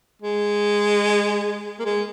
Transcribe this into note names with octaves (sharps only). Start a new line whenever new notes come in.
G#3
A#3
G#3